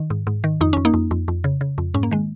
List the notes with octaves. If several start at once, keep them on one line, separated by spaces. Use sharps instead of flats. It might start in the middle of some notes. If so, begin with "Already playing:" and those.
Already playing: D#3
G#2
G#2
D#3
F2 D#4
F2 C#4
A#3 D#4
F2
F2
F2
C#3
C#3
F2
G#2 C#4
A#3
D#3 G#3